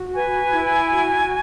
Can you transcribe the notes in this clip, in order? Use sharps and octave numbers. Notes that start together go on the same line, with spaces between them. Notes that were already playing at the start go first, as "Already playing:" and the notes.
Already playing: F#4
B4 G#5
E4
F#4